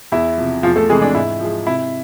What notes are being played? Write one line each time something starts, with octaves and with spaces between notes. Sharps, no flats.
E2 E4
C3 F3
E2 F3 F4
A3 A4
C3 E3 G#3 G#4
D4
G#2 E4
F3 G#3
C3 E4